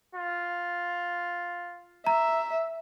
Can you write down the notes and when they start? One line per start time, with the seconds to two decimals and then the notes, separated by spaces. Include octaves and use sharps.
0.15 F4
2.06 E5 A#5